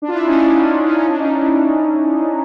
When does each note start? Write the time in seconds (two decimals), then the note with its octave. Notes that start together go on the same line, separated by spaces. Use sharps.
0.02 D4
0.08 F4
0.14 D4 E4
0.26 C#4 D#4
0.37 D4
0.50 C#4
0.61 D4
0.84 C#4 D#4
0.96 C#4 D#4
1.08 D4
1.19 C#4 D#4
1.32 D4 E4